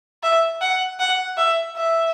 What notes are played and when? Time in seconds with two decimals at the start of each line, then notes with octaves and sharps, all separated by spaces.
0.23 E5
0.61 F#5
1.00 F#5
1.37 E5
1.76 E5